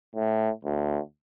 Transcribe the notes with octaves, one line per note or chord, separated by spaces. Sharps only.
A2
D2